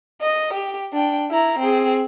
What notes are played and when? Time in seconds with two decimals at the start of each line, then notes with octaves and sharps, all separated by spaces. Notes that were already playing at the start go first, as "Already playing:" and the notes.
0.22 D#5
0.54 G4
0.93 D4 G5
1.31 E4 A#5
1.60 C4 G#4